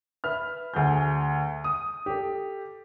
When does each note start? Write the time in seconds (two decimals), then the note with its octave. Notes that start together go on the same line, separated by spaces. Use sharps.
0.24 B4 E5 F6
0.74 D2 G#4 G6
1.64 D#6
2.06 G4 A4